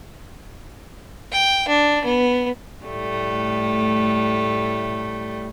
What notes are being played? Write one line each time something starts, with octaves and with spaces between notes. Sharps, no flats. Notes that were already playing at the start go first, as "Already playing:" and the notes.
G5
D4
B3
A2 G3 A3